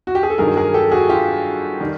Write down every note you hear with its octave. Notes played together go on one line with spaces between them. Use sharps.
F#4
G4
G#4
A4
G2 D#3 F#3 G#4 A#4
G#4 A#4
G4 A4
F#4 G#4
F4 G4
D#3 G3